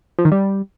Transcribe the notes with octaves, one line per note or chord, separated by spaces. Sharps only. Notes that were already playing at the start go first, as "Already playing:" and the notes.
F3
D#3
G3